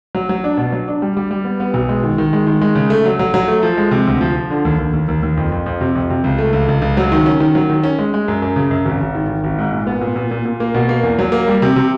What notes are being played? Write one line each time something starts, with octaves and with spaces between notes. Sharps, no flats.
F#3
F#3
D4
B2
F#3
D4
G3
G3
G3
B3
B3
B1
G#3
D#3
D#3
G#3
D#3
G#3
C#3
A3
F#3
F#3
F#3
A3
F3
G#3
C3
D2
F3
F3
D3
D#2
D#2
D#2
D#2
D#2
F2
F2
F2
C3
F2
C3
C#2
A3
C#2
C#2
C#2
F#3
D#3
C#4
D#3
F#3
D#3
C#4
G#3
G#3
F#2
F#2
C#3
F#2
G#1
G#1
D#3
D#3
G#1
G#2
A#2
B3
A#2
A#2
A#2
A#2
A#3
B2
A#3
E2
F#3
A#3
G3
C3
C3